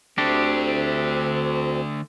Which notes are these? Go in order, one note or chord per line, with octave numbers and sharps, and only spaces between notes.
D2 D3 A3 C4 D4 G4